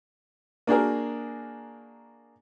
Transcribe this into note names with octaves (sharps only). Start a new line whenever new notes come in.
A#3 D4 F#4 G#4 A#4